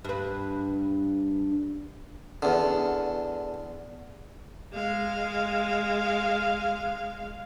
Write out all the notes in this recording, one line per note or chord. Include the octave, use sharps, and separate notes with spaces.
G2 B4
E2 D3
G#3 F5